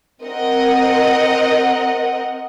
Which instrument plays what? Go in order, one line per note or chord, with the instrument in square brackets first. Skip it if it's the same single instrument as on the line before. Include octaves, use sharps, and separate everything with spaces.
[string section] C4 A#4 D#5 F#5